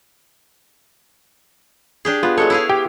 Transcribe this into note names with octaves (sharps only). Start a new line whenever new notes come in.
D4 G4 G#4
B3 F4
F#3 G#3 A4 C#5
E4 G#4 F5
G4 G5